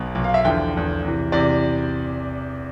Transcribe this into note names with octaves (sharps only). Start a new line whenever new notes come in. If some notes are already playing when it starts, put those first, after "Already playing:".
Already playing: B1 B2
B1 B2
F5
E5
E2 D3 F3 G5
E2 D3 F3
E2 C3 E3
E2 C3 E3 D5